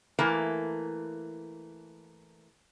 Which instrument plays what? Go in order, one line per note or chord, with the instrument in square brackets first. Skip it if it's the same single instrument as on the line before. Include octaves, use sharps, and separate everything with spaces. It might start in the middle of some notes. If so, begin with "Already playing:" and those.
[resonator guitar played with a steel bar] E3 A3 A#3